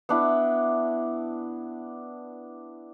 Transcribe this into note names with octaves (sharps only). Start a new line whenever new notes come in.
B3 D4 E4